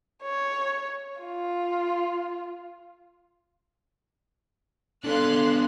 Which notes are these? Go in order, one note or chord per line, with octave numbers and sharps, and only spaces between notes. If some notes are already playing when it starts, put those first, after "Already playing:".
C#5
F4
B3 D4 A4 F5 C6 F#6